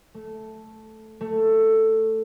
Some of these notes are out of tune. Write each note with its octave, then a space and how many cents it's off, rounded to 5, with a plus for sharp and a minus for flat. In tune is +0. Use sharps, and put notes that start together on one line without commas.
A3 -5
A3 +10